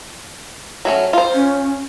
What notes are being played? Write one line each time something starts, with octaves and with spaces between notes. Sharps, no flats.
F#3 A3 C#4
F4 C5
C#4